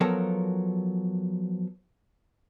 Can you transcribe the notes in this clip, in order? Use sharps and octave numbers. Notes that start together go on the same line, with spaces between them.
F3 F#3 B3 A4 A#4